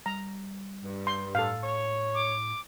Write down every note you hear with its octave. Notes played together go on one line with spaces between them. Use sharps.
G3 A#5
G2
C6
A2 A4 F5
C#5
D6